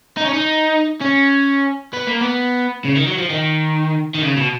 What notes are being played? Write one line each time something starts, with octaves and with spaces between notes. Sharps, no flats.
D#4
C#4
D#4
C#4
B3
A#3
B3
C#3
D#3
F#3
F3
D#3
D#3
C#3
B2